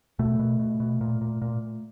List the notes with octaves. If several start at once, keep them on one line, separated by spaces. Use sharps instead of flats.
B2 A3
B2
B2
B2
A#2
A#2
A#2